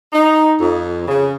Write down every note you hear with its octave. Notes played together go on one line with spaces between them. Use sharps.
D#4
F2
C#3